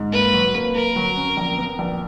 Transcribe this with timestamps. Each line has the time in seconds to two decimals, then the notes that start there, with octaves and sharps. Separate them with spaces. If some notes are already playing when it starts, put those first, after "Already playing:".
Already playing: G#2
0.13 A#3 B4
0.34 F#3
0.54 A#3
0.75 A#3 A#4
0.96 F#3
1.16 C#4
1.37 A#1
1.58 B3
1.79 A#1